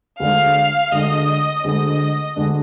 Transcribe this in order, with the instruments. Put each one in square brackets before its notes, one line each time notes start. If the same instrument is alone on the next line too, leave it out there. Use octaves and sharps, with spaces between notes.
[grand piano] D2 D3 G#3 D4 [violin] F5
[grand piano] D2 D3 G#3 D4 [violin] D#5
[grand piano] D2 D3 G#3 D4 [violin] D#5
[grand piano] D2 D3 G#3 D4